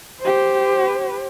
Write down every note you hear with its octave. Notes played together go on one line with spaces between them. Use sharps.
G4 C5